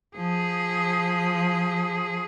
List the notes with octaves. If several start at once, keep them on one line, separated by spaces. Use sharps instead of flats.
F3 G#4